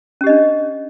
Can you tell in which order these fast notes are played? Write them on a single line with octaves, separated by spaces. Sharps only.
C#4 G4 D#5 D4